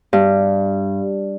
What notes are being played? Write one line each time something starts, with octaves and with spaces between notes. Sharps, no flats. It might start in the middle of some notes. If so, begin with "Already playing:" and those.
G2